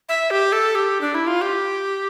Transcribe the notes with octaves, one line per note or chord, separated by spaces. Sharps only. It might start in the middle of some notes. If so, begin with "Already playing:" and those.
E5
G4
A4
G4
D4
E4
F4
G4